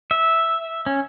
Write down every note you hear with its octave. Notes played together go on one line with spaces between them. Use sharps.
E5
C#4